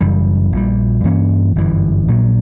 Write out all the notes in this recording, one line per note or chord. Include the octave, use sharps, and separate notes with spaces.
F#1 F#2 E3 G3
A#1 A#2 G3
G2 E3 A#3 C#4
G1 F#2 C#3 E3
A#1 A#2 F#3